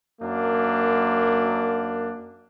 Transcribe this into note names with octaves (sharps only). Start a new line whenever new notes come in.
F#2 A#3 D4